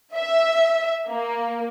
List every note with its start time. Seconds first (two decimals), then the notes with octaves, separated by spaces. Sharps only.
0.15 E5
1.08 A#3